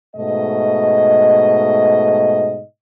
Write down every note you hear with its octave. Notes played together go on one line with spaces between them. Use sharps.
G#2 B2 A3 D#5